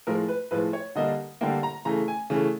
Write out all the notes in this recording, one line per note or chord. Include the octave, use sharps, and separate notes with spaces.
A2 F3 G#3 A#4
B4
A2 F3 G#3 B4
C#5
D3 G3 A#3 D#5
D3 G3 A#3 G5
A#5
C#3 E3 A3 A#5
G#5
C#3 E3 A3